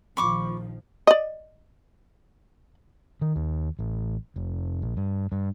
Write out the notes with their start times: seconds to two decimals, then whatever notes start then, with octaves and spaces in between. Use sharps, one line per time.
0.17 A#1 D#3 F3 B5 C#6 D6
1.07 D5 D#5
3.21 D#3
3.36 D#2
3.79 A1
4.36 F1
4.82 A#1
4.97 G2
5.32 G2